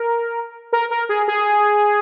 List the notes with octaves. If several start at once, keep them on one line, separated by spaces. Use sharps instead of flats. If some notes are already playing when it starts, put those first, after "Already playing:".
Already playing: A#4
A#4
A#4
G#4
G#4